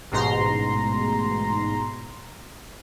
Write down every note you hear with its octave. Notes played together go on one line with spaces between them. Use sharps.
A1 G#2 B2 A#5 C6